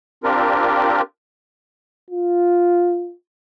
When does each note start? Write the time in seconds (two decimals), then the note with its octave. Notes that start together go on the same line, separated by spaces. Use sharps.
0.24 C4 D4 F4 G4 A#4
2.10 F4